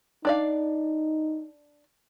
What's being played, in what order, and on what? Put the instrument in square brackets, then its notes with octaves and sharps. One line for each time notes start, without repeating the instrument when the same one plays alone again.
[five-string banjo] D4 D5 F5 [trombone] D#4